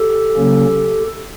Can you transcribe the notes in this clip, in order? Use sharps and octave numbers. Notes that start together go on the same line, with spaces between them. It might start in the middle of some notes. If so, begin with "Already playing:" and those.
Already playing: G4 A4
C#3 F#3 A#3 C#4